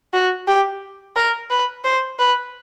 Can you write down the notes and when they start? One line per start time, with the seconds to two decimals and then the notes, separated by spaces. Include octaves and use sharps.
0.13 F#4
0.47 G4
1.16 A#4
1.50 B4
1.84 C5
2.19 B4